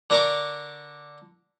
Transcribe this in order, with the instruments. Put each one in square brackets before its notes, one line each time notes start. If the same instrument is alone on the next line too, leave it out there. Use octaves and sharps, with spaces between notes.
[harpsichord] D3 D4 A#4 D5 C#6 D6